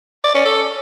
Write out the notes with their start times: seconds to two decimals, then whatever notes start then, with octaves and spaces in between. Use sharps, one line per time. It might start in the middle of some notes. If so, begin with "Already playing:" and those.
0.24 D5
0.35 C#4
0.45 A4